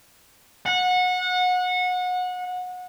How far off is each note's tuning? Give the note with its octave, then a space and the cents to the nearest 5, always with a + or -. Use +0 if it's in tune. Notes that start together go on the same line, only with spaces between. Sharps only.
F#5 -25